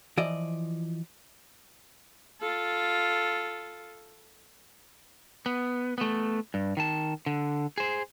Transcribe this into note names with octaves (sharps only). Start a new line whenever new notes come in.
E3 F3 D5 D#5
F4 A4
B3
A3 B3
G2
D#3 A5
D3
G#4 C5